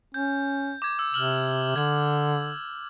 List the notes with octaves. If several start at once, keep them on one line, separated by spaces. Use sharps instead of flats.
C#4 G6
D6 G#6
E6
C3 F6 F#7
D3 G#6 F#7